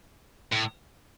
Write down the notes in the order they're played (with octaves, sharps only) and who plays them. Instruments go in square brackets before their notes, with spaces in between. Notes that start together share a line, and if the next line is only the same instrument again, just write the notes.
[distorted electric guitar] A2